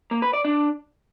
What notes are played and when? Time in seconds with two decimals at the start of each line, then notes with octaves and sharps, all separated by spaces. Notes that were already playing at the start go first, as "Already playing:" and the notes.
0.11 A#3
0.22 B4
0.33 D5
0.45 D4